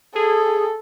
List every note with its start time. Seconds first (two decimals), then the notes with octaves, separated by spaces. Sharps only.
0.15 G#4 A4